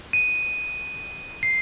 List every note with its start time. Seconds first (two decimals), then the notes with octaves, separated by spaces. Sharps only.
0.13 D#7
1.43 C7